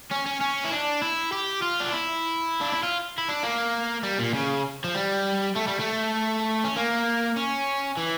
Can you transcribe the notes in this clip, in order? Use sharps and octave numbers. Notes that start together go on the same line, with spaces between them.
C#4
C#4
C#4
E4
D4
E4
G4
F4
D4
E4
D4
E4
F4
E4
D4
A#3
G3
A#2
C#3
F3
G3
A3
G3
A3
C#4
A#3
C#4
E3